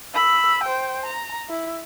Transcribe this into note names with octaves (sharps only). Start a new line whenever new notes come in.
B5 E6
C5 G5
A#5
E4